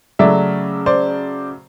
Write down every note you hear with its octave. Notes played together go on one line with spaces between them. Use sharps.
C#3 F#3 A3 D5 E5
C5 D5